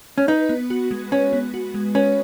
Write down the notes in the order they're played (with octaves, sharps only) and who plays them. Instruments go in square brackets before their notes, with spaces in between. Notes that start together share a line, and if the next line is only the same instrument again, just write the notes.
[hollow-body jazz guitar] C#4
[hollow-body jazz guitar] D#4 [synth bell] B4
[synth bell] B3
F#4
G#3
[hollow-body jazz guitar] C#4 [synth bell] B4
[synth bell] B3
F#4
G#3
[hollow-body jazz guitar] C#4 [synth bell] B4